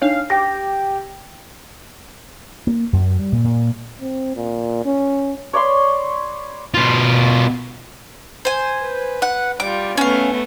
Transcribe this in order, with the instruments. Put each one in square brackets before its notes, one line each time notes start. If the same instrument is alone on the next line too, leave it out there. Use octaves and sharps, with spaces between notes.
[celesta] D4 D#4 C#5 [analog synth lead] F5
[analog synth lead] G4 [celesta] G5 A#6
[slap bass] A#3
F#2
G3
A#2
A#2
[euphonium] C4
A#2
C#4
[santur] C#5 D5 B5 C6
[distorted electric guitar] B2 F4
[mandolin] C5 G#5
[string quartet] B4
[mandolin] F#5
[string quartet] G3 F4 [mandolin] D6
[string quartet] A3 B3 [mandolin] C#4 F5